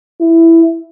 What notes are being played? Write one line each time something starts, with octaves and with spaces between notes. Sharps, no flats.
E4